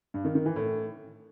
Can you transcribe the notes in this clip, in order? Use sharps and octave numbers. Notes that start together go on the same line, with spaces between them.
G2
D#3
D#3
E3
A2